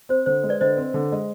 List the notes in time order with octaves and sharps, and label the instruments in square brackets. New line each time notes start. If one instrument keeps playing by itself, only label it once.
[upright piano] C4 [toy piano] C5
[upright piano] D3 [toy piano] C5
[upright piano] G#3
[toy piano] B4 D5
[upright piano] D3 [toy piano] C5 D#5
[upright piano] C4
D3
G#3